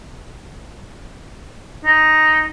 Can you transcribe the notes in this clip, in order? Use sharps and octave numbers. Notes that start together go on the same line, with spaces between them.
D#4